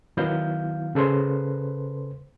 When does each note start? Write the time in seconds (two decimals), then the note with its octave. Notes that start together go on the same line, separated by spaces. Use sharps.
0.17 D#3 F#3 B3 E4 F5 G6
0.95 C#3 A4 B4 C5 C6